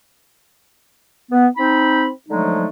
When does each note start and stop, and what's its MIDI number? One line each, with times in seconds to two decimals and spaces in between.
1.31 1.48 59
1.57 2.08 60
1.57 2.08 63
1.57 2.08 83
2.29 2.69 50
2.29 2.69 53
2.29 2.69 54
2.29 2.69 56
2.29 2.69 57
2.29 2.69 63